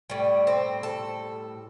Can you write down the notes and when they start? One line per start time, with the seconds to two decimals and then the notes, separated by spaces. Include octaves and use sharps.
0.10 A2 G3
0.47 C4
0.83 A4